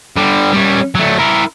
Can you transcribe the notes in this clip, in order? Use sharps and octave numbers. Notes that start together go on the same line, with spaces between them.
D3 G3
G3 C#4
F#3 A3
E4 A#4